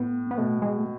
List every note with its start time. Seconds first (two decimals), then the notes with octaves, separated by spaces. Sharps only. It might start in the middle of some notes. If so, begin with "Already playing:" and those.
Already playing: A2 B3
0.31 B3
0.38 B2 A3
0.62 G#3
0.78 A3